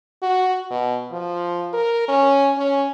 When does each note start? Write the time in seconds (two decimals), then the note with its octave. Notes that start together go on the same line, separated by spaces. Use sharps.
0.22 F#4
0.71 B2
1.11 F3
1.73 A#4
2.08 C#4
2.58 C#4